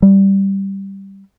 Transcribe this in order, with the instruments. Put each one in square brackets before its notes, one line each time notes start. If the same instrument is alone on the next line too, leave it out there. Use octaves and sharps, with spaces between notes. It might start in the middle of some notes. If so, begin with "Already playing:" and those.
[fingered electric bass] G3